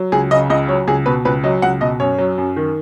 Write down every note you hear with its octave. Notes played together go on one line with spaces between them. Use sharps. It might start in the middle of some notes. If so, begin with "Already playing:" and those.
Already playing: F#3
C#2 G#4
C#3 D#5
C#2 D#5
F#3 C#5
C#2 G#4
B2 B4
C#2 B4
F#3 D#5
C#2 F#5
B2 D#5
F#2 C#5
F#3
F#2
D#3